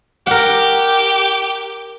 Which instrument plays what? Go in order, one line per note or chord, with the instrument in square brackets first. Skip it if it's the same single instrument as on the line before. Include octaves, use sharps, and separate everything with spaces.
[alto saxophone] G4 [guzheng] A#4 F#5